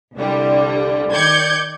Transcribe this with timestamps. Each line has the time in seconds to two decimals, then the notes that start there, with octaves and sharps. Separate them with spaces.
0.15 C2 D3 G3
1.11 D#3 D5 G6 G#6 C#7